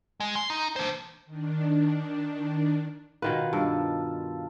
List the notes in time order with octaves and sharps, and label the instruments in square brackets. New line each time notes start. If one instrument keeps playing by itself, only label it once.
[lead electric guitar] G#3
C6
D#4
D4 C5
[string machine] D#3 D4
[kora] B2 D#3 B4 [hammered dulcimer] F4
[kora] G2 [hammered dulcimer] A4 A5